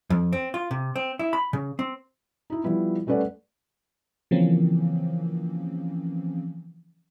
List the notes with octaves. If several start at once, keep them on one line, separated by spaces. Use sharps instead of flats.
F2
C4
F4
C3
C4
E4
B5
C#3
C4
D#4 E4
F3 G3 B3 E4
G3 A3 C#4 B4 D5 F#5
C#3 E3 F3 A#3 C4 C#4